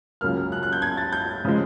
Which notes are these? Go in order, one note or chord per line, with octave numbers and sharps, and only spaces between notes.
C#2 C#3 F#3 A#3 F6
F#6
F#6
G6
G#6
A6
G6
C#3 F3 G#3